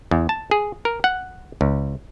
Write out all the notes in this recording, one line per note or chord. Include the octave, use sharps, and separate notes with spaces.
E2
A5
G#4
A#4
F#5
C#2